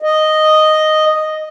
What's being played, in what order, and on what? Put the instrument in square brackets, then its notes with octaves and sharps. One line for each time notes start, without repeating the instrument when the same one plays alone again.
[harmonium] D#5